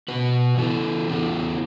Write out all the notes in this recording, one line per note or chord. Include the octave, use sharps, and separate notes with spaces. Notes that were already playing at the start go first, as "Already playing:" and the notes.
B2 B3 F#4 B4
E3 B3 E4 A4
E3 B3 E4 A4